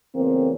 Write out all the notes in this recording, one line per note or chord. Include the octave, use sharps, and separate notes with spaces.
E2 C#3 F#3 A3 A#3 C4